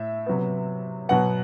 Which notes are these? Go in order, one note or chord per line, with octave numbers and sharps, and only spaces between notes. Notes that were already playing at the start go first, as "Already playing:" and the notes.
Already playing: A2 E5
C3 F#3 B3
B2 F#3 B3 F#5